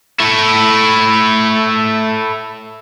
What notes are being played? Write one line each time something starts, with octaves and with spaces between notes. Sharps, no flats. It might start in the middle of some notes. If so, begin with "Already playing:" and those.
A3 E4